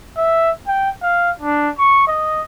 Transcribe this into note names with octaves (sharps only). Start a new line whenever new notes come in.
E5
G5
F5
D4
C#6
D#5